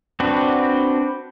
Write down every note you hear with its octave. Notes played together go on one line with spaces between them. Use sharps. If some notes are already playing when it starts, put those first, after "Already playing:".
C4 D4 F#4 B4